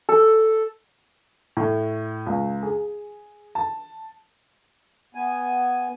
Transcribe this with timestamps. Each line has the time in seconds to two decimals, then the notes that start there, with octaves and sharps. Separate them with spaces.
0.09 A4
1.57 A2
2.27 C#2
2.63 G#4
3.55 A5
5.15 B3 G#5